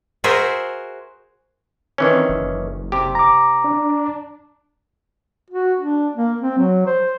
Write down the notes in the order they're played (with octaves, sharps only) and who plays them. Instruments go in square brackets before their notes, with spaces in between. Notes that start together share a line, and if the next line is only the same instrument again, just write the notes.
[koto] F#4 G#4 A#4 C5 E5
[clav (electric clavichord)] D#3 E3 C#4 [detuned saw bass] C4
[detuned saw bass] F#1
[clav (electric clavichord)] C3 G4
[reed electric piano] A#5 D6
[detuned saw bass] D4
[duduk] F#4
D4
A#3
C4
F#3
C5